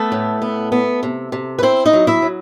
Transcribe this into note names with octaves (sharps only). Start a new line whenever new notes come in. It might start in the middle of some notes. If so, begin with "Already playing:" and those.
Already playing: A3 B3 A4
A2
B3
B3
C3
C3
B4
C4 E4 C5
D#4 D#5
F#3
E4 E5
F#3